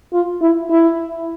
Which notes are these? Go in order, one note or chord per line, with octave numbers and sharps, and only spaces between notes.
F4
E4
E4